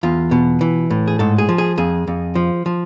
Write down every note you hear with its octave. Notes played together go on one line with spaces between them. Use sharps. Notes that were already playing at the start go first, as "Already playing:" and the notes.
E2 F4
B2
E3
A2
G#4
G#2 A4
G#4
F3
G#4
F2 G#4
F2
F3
F3